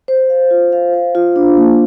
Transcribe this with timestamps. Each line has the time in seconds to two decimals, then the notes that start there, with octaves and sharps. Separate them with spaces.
0.08 C5
0.30 F5
0.51 F4
0.73 F5
0.94 C5
1.15 F4
1.36 D4
1.57 A#3